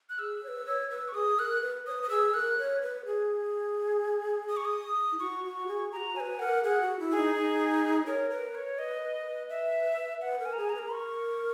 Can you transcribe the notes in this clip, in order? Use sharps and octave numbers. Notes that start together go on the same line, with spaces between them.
F#6
G#4 E6
C#5
B4
C#5
B4 E6
C#6
G#4 D#6
A#4 F#6
B4
C#5 D#6
B4
D#6
G#4 E6
A#4 F#6
C#5
B4
G#4
D#6
C#6
D#6
E4
F#4 C#6
F#4
G#4
F#4 G#4 A#5
B4 C#5 G#5
A#4 F#5
G#4 F#5
F#4
E4
G#4
D#4
D#4
A#4 C#5
A#4 B4
C#5
B4 D#5
B4
B4
E5
B4 F#5
A#4
G#5
A#5
G#4 G#5
A#5
B4
A#4
C#6